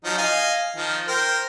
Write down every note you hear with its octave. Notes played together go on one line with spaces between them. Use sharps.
F3 F#3 D#4
D#5 F5 G#5
D#3 F3
A#4 C5 G5